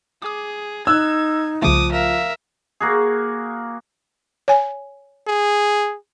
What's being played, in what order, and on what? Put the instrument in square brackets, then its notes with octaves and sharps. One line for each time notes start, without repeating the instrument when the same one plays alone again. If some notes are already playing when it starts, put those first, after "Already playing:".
[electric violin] G#4 [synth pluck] D6 D#6
[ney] D#4 [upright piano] E6 F#6 [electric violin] G#6
[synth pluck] C2 C#3 A3 [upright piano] F3 [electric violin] D6 D#6
[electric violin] A#4 E5 [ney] F5
[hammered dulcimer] A#3 F#4 G#4
[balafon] C#5 G#5
[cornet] G#4